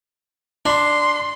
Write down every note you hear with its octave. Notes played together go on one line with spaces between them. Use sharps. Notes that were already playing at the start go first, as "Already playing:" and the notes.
D4 C6